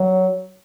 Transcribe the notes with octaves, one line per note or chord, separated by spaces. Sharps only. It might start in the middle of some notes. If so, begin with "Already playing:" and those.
Already playing: F#3